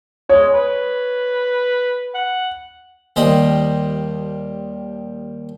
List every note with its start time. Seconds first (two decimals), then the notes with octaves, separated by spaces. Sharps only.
0.29 G#3 C#5
0.54 B4
2.15 F#5
3.16 D#2 G3 C5 D#5 B5